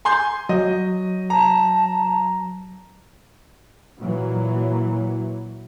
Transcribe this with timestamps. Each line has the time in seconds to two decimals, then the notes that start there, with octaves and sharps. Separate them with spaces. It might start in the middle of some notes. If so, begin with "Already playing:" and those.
0.05 G#5 C6 G6
0.49 F#3 D#5
1.30 A5 A#5
4.01 A#2 E3 F#3